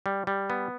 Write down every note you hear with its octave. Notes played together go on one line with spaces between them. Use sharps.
G3
G3
B3